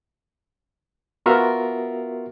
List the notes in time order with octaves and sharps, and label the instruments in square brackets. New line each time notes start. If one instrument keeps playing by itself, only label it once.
[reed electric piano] B3 F4 F#4 A#4 E5